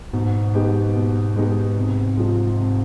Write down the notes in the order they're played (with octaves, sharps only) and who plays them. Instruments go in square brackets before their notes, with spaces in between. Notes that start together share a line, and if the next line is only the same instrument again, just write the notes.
[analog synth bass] G#2 [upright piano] B2
[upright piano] G#3 B3 D#4 G4
B2
G#3 B3 D#4 G4
C3
F3 G#3
C3